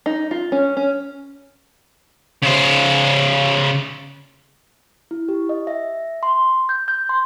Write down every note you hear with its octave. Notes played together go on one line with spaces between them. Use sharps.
D#4
F4
C#4
C#4
C#3 C5
E4
G4
D#5
E5
C6
G6
G6
C6